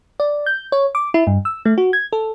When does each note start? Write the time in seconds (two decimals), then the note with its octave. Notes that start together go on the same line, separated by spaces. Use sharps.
0.20 D5
0.46 G6
0.72 C#5
0.95 D6
1.14 E4
1.27 G2
1.45 E6
1.65 A3
1.78 F#4
1.93 G#6
2.13 A4